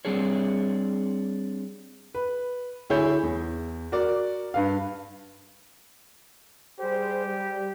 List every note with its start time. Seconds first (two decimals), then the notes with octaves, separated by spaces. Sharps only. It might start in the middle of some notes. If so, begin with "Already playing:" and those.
0.05 G3 C4 D4 G#4 C#5
2.15 B4
2.90 D2 E4 G#4 C#5 G6
3.23 E2
3.92 F#4 A#4 D5
4.54 G2 B4 F5
6.80 G3 G4 G#4 C5
7.26 G3